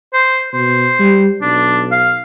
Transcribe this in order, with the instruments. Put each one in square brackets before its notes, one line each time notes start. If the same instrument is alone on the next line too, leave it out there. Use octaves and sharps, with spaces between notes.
[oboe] C5
[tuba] B2 [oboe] C5
[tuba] G3
[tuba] B1 [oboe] D4
[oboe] F5